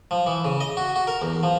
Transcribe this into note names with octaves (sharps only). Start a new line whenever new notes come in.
F3
E3
C#3
D#5
F#4
F#4
A#4
E2
F3